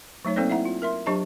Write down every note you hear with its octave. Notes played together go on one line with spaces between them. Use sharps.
F#3 A3 D#4 C#5
A#3 C4 D#4 A4 C5 D5
E4 E5 F#5 A#5
F4
A#4 E5 C6
F#3 D4 G4 D#5 A5 A#5